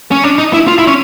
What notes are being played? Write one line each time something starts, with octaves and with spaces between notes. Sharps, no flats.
C#4
D4
D#4
E4
F4
E4
C#4